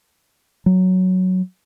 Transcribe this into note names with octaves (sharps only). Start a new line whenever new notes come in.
F#3